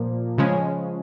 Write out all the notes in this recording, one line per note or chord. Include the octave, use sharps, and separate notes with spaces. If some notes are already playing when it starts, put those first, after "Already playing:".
Already playing: A#2 F3 A#3
C#3 F3 G#3 C#4